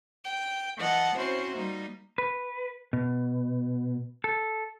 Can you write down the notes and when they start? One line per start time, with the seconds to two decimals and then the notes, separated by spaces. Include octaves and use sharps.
0.24 G5
0.77 E3 D#5 F#5 A5
1.16 C4 C#4 E4 F#4 C5
1.56 G3 A#3 D#4
2.18 B4
2.93 B2
4.24 A4